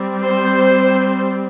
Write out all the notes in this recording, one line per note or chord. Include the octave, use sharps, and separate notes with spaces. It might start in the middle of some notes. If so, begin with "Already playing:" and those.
Already playing: G3 C4
C5